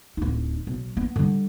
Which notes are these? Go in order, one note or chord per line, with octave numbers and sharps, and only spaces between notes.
D1 D#4
B1
B3
D3 G3